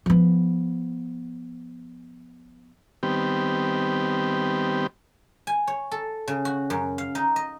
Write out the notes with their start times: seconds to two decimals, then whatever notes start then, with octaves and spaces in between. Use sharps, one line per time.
0.06 F3 B3
3.03 D#3 G3 B3 C4 G4
5.47 G#5
5.67 C#5
5.91 A4
6.28 C#3
6.45 F#4
6.70 F#2
6.98 F5
7.15 D#4
7.36 D#5